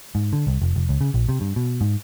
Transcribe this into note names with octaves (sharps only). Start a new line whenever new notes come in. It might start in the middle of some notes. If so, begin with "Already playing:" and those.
G#2
D3
C2
F1
F1
C#2
C#3
A#1
C3
G2
B2
G#2